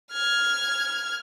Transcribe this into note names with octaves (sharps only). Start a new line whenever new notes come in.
F6 G#6